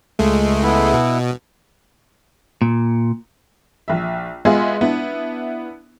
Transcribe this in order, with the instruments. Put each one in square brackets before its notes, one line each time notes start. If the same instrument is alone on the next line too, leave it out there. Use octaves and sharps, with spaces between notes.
[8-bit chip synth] C#2 G#3 A3
[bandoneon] B3 E4
[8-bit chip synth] B2
[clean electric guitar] A#2
[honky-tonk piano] A#1 E5
G#3 B3 F4 G#4 E5
B3 D4 E4